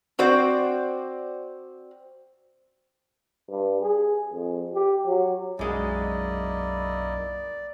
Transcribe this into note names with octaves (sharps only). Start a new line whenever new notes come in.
C4 F#4 C5 D5
G2
G#4
F2
G4
F#3
B1 F#2 G#3 A#3 E4 D5 D#5